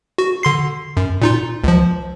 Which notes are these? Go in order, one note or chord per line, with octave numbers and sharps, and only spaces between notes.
F#4
D3 C6 C7
F#2
A#2 D#4 F4
C#2 F3